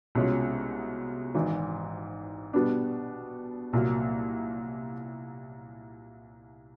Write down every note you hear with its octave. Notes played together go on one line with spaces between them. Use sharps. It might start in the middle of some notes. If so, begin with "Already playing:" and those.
C2 B2 G#3 C#4 F4
G#1 G#2 E3
B2 G3 B3 D4
C2 A#2 F#3 A#3